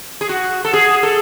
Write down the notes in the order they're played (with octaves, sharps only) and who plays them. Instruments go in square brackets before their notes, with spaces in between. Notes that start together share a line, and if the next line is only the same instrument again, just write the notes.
[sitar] G#4
F#4
A4
G#4
A4